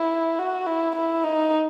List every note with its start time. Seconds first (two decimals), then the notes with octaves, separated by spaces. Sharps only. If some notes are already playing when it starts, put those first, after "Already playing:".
Already playing: E4
0.39 F#4
0.67 E4
0.96 E4
1.24 D#4